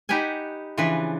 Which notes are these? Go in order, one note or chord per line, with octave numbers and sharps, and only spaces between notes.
D#4 G4 B4 F#5 G#5
C#3 E3 F3 D4 B4